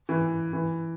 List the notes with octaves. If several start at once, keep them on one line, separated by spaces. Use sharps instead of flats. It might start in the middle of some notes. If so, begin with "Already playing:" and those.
E3
E3